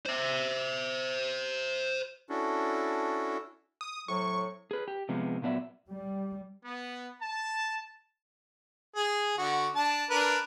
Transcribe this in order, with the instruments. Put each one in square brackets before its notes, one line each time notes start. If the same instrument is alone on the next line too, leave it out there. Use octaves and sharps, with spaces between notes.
[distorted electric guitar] C5 E5
[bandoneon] C#4 D4 E4 F#4 A4
[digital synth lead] D#6
[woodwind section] A2 C3 F#3 [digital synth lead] C#6
[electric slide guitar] G#4 B4
G4
C3 F3 G#3 B3
A#2 F#3 B3 D5 E5
[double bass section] G3
[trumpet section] B3
A5
[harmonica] G#4
D3 F#4
D4 A5
D4 A#4 B4